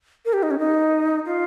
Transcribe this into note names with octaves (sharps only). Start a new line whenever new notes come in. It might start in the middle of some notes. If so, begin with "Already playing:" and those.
A#4
G4
D#4
C#4
D#4
F4